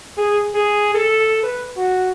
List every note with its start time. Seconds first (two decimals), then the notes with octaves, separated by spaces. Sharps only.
0.17 G#4
0.54 G#4
0.94 A4
1.43 B4
1.76 F#4